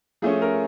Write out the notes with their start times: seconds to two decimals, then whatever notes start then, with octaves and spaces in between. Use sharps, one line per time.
0.22 F3 A3 C#4 G#4
0.42 A#4